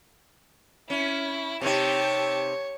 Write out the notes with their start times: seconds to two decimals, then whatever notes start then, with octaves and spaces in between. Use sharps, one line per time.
0.90 C#4 E4
1.61 C3 D#4 G4 C#5 A5